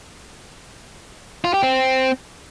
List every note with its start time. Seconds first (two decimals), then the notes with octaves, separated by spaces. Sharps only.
1.45 F4
1.54 G4
1.63 C4